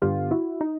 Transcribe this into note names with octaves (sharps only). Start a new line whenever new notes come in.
G2 D3 G3 B3 F4 G4
E4 F#4
D#4